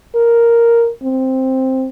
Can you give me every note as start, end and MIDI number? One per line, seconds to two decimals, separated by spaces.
0.15 0.90 70
1.03 1.89 60